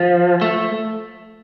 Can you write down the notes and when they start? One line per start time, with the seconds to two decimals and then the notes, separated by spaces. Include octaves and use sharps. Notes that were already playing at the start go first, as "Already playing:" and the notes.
Already playing: F3
0.42 A3